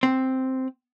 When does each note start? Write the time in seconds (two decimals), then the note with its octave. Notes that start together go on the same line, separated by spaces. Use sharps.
0.03 C4